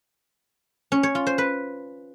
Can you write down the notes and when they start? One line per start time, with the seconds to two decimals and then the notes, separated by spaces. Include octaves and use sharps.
0.92 C#4
1.03 C#5
1.15 F4
1.27 C5
1.38 B4